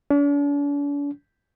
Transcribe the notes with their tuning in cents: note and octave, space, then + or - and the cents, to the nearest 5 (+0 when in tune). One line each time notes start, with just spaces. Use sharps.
D4 -45